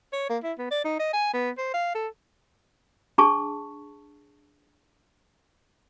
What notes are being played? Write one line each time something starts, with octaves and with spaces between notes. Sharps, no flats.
C#5
A#3
E4
B3
D5
D#4
D#5
G#5
B3
C5
F5
A4
D4 G#4 A5 C#6